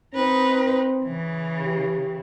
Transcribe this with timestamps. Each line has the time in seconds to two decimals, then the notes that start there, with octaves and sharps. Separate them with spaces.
0.15 C4 D#4 B4
1.04 C#3 E3
1.63 G4